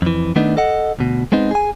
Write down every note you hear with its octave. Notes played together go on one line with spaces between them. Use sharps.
F2 E3
D#3 A3 B3 D4 D#4
A4 D#5 F#5
D2 B2
G#3 B3 C4 D#4
G#4 G#5